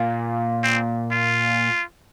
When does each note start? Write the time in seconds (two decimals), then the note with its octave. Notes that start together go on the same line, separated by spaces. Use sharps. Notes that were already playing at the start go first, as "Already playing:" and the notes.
Already playing: A#2
0.64 C4
1.11 F4